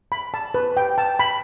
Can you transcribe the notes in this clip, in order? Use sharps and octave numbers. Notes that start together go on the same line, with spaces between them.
B5
A5
B4
G5
A5
B5